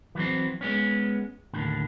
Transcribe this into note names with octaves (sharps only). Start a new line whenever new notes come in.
E3 F#3 C4
G#3 B3 C#4
D#2 A2 D3